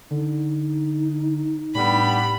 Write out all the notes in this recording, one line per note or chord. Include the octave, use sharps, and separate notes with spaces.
D3 D#4
A2 G3 B3 D4 B5